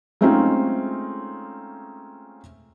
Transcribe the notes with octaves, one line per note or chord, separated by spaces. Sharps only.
G#3 A3 C4 C#4 D#4 F4